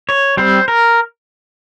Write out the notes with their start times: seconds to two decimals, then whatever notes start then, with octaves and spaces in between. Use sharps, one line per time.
0.09 C#5
0.37 G3 C4 C5
0.68 A#4